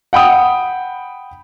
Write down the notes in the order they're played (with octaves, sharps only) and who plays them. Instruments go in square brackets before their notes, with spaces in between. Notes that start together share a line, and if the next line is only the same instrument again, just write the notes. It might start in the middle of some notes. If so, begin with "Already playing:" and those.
[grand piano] F#5 G5 B5 D#6